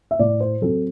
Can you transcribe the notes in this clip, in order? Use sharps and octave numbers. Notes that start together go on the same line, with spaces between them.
E5
A2 D5
C5
F#3 C4 A4